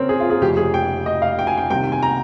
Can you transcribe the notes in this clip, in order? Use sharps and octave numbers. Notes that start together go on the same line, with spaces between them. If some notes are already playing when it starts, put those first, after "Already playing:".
Already playing: C#3 C4 C#4 A#4
G#4
F4
G#4
F1 F2 C#3 G4
G#4
G5
D#5
F5
G5
G#5
G5
C2 C3 D#3 G5
G#5
A#5